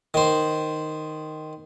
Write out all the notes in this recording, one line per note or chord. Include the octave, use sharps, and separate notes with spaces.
D#3 C5